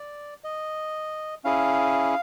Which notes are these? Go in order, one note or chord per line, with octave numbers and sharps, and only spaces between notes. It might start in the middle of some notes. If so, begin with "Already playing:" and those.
Already playing: D5
D#5
C#4 E4 G#4 F5